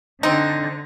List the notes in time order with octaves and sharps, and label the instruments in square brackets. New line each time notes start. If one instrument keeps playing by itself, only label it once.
[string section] D3 [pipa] C4 D#4